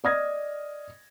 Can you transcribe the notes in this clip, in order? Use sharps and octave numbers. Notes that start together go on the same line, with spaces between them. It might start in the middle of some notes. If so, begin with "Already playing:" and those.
D5 D#5 D#6 F6 G#6 A#6